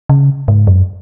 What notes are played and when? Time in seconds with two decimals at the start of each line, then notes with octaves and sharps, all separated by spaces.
0.09 C#3
0.48 G#2
0.67 F#2